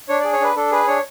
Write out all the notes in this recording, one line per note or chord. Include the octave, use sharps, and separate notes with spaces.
D4 C#5
G#4 D5
C#5
D4 B4
D4 A4
G#4 B4
D4 C#5